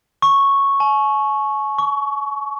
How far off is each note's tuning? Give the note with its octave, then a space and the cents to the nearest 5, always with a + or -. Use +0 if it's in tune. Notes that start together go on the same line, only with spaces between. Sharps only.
C#6 -5
G#5 +45
C#6 +25